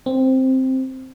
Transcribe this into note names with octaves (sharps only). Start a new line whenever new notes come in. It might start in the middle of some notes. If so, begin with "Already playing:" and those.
C4